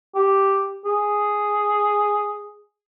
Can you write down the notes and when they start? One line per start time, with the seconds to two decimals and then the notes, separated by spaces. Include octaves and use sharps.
0.15 G4
0.85 G#4